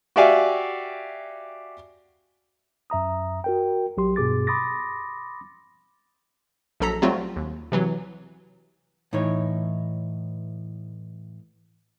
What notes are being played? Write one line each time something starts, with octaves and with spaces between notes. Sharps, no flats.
F#4 G4 D5 E5 F5 G#5
F#2 E5 A#5 D#6
F#4 A#4 G5
A#1 F#3 G4 C6
G2 B2 G#4 D6 A6
B5 C6 D6 D#6 A6 A#6
A#1 F#3 A4 A#5 B6
F#3 G3 A3 C4 F4 F#4
D#2
C3 E3 F#3
A2 E3 D#4 C#5